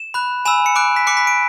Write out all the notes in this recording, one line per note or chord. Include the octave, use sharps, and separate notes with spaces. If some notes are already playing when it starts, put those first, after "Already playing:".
Already playing: E7
B5 F#6
G#5 B5 E6 E7
C#7
B5 D6 F#6 D7
B6
B5 D6 F#6 C#7
B6
D7